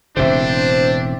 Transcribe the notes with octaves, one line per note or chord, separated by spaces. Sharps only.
E1 A2 C#3 C4 D4 G4 C5 E5